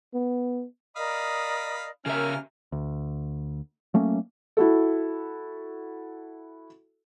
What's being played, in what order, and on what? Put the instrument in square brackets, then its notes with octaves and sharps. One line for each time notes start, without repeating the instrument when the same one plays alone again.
[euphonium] B3
[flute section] A#4 D5 D#5 [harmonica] F5 B5 D#6
[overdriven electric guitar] C#3 E5 [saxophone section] C#4 A#4 [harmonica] F6
[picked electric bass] D2
F#3 A3 A#3 C#4
[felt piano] E4 F#4 A4